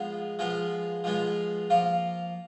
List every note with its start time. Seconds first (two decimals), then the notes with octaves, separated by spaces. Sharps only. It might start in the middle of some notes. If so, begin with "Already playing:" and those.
Already playing: F3 G#3 B3 F4
0.39 F3 G#3 B3 F4
1.04 F3 G#3 B3 F4
1.70 F3 A#3 F4